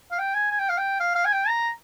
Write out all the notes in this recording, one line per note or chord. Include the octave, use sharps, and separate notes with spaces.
F5
G5
G#5
G#5
G5
F5
G5
F5
F5
G#5
G5
A#5